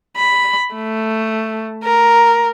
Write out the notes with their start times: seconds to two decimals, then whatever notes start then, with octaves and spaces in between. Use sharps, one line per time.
0.17 B5
0.75 A3
1.84 A#4